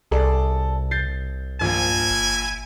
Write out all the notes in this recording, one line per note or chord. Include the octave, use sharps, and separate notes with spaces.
C2 C3 G#4 A4 D5
G6 A6 C7
A#1 G2 A#2 F3 E4 G#5
G1